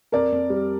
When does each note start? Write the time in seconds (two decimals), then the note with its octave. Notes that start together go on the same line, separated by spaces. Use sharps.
0.12 F2 A#4 D5
0.32 F2
0.50 G3